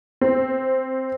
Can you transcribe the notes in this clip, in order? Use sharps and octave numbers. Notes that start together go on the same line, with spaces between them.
C4